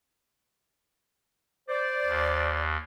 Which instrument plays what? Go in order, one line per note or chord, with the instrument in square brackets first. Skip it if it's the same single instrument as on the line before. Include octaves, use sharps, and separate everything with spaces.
[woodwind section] C5 D5
[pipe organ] D#2